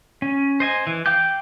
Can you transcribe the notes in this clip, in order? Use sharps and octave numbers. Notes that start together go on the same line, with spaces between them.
C#4
C5 D#5 G#5
E3
F5 G5 D6 G6